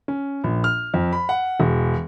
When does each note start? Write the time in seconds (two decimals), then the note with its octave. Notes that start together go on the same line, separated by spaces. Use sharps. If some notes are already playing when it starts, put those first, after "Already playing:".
0.08 C#4
0.44 A#1
0.64 F6
0.94 F2
1.13 B5
1.29 F#5
1.60 E1